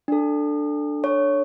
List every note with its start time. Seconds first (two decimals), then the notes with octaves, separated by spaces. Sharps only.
0.08 D4 A4
1.04 C#5